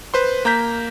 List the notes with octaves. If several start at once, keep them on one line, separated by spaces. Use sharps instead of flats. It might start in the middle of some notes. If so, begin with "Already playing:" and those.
B4 C5 C6
A#3 A#5 G6 B6